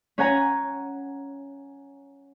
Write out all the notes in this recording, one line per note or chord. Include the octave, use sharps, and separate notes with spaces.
C#4 C#5 F#5 G#5 A#5